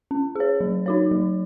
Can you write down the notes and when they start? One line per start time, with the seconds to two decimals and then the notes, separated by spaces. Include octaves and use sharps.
0.11 C#4
0.35 G#4 C#5
0.61 F#3
0.86 D#4 F#4 C#5
1.11 F#3